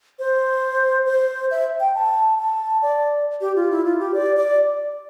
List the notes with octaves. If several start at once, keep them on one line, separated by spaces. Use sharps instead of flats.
C5
C5
E5
G5
A5
A5
D5
G4
F4
E4
F4
G4
D5
D5